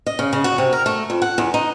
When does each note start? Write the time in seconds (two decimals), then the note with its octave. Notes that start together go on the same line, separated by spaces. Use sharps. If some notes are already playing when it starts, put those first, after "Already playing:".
0.06 D#5
0.19 C#3
0.33 C#3
0.44 F#4
0.58 C3
0.73 A#4
0.86 A3
1.10 F2
1.22 F#5
1.38 E2
1.54 D#4